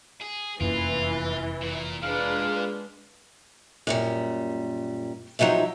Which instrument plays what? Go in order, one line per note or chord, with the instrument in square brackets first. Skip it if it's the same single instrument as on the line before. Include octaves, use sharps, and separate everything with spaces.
[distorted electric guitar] G#4
[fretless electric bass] F1 F#2 A#3 [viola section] E3 [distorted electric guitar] F4
[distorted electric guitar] A#2
[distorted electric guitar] A#2 [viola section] G#3 D4 B4 [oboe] F5
[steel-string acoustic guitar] F#2 A#2 G3
F3 F#3 D#4 G4 E5